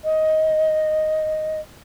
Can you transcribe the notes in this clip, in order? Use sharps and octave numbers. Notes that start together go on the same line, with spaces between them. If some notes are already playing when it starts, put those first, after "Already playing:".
D#5